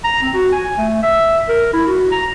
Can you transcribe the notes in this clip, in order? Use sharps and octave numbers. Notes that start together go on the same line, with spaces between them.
A#5
C4
F#4
G#5
A3
E5
A#4
E4
F#4
A#5